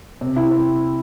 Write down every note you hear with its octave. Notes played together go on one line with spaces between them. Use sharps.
C3
E4
C4